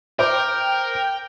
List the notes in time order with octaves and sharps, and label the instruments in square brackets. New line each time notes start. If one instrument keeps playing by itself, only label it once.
[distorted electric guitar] A#4 [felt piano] C5 D6 [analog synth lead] G5